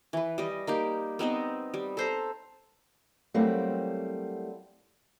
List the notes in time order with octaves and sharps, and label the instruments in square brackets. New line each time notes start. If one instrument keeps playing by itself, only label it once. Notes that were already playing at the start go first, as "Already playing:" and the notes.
[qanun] E3 B4
G3 D#5
A#3 D#4 G4
B3 C4 D#4 D#5
G3
A4 C5 A#5
[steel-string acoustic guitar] F#3 G3 A3 A#3 C4 E4